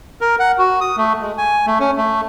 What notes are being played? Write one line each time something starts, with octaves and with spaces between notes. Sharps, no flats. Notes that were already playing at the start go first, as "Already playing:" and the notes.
A#4
F#5
F#4
D#6
A3
G#3
G#5
A3
C#4
A3